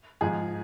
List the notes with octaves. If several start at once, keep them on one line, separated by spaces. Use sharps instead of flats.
G#2 F3 G#3 G#4